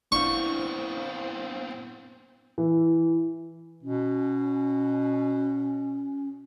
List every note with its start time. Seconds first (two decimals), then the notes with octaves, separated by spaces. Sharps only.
0.12 B3 C4 D4 E4 F5 C#6
2.58 E3
3.83 B2 C#4